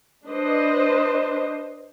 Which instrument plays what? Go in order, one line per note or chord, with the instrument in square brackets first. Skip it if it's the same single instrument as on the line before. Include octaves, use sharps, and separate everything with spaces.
[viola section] D4 B4 C5 D#5